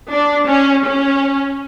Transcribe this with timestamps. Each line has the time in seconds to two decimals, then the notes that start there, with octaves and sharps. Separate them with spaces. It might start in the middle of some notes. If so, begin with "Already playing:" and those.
0.11 D4
0.48 C#4
0.85 C#4